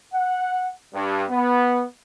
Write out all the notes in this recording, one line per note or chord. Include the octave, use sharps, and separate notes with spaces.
F#5
G2
B3